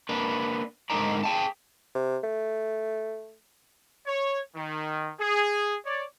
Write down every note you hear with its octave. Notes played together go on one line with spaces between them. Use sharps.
A#3 D4 B4
G#2 D3 D#4 A#4 D5 A#5
G#4 G5 A5
C3
A3
C#5
D#3
G#4
C#5 D5